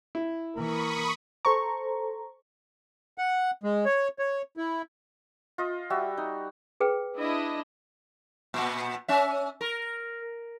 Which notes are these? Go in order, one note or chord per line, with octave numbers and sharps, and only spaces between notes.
E4
E3 A#3 A#4 B5 C#6 D#6
A4 C5 A#5 C#6
F#5
G#3
C#5
C#5
E4
F4 D#5
G3 F#4 E5
D#4
G#4 B4 G5
D4 E4 D#5
A#2 B3
C#4 E5
A#4